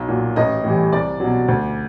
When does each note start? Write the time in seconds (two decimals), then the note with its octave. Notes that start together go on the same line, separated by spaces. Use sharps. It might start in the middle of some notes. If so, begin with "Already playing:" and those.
Already playing: B1
0.08 A#2 F#3
0.36 A1 D#5
0.64 A2 E3 G3
0.92 C2 D5
1.20 B2 F#3
1.48 D2